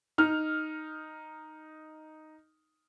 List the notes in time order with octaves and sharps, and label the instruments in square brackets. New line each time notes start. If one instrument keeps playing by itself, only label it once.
[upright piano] D#4 F6